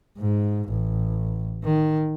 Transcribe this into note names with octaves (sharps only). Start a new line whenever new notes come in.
G#2
A1
D#3